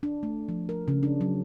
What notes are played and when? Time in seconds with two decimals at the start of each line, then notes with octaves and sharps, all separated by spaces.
0.03 D4
0.23 A3
0.48 F3
0.69 A#4
0.88 C#3
1.03 D4
1.21 F#3